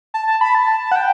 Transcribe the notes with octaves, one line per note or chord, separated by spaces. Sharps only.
A5
A5
B5
A5
F#5
G5